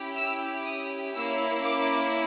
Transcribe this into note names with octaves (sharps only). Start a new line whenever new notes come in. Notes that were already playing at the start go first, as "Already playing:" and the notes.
Already playing: C#4 E4 G4
E6
D#6
A#3 C#4 E4 E6
D6